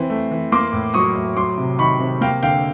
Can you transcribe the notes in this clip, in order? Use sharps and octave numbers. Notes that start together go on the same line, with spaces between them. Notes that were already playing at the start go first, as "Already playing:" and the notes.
Already playing: E3 C4
A3
E3
A#3 C6 D6
A2
F#3 C#6 D#6
A2
F#3 C6 D6
C3
D#3 B5 C#6
C3
A#3 F5 G5
D3 F5 G5